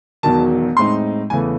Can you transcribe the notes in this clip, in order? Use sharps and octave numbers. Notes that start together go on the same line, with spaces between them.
E1 E2 D#3 F#3 A5
A2 G#3 C4 D#4 C6
E2 C#3 E3 A3 G#5